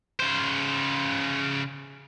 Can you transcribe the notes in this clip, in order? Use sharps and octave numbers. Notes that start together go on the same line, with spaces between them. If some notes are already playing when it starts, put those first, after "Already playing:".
C#3 C5